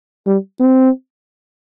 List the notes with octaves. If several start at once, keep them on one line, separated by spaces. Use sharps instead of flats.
G3
C4